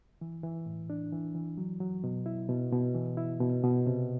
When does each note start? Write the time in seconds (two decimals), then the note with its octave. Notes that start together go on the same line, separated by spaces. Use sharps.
0.21 E3
0.43 E3
0.66 A2
0.90 D4
1.12 E3
1.35 E3
1.58 F#3
1.80 F#3
2.04 B2
2.26 E4
2.49 B2
2.73 B2
2.95 E3
3.17 E4
3.41 B2
3.64 B2
3.86 C3